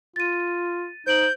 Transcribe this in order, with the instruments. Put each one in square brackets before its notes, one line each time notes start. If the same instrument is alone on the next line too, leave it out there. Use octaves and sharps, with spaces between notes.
[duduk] F4 [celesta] A6 D#7
[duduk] D#4 [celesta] C5 D7 F#7 [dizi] G6